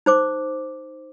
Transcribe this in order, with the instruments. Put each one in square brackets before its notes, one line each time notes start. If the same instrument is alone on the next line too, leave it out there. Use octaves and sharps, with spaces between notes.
[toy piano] D#4 C5 D6